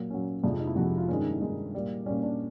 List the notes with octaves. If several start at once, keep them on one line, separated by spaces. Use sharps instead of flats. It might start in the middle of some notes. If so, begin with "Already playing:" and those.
Already playing: A#2 F#3
A#2 F#3 C#4
F2 C3 F3 G#3 D4
D#4
E4
F2 C3 F3 G#3 F#4
G4
F4
G2 D#3 G#3 C#4
D#4
E4
G2 D#3 G#3 D#4
A#2 G3
A#2 G3 C#4
D4